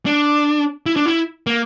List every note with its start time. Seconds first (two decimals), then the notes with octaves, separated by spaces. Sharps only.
0.06 D4
0.86 E4
0.96 D4
1.06 E4
1.47 A#3